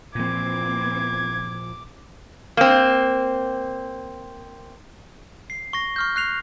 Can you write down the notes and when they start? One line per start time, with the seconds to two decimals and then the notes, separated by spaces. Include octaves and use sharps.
0.15 A#2 E3 F3 A#3 C4 D6 G#6
2.57 A#3 C4
5.50 C7
5.73 C#6 A#6
5.96 C#6 F6 G6
6.16 F#6 C7 F7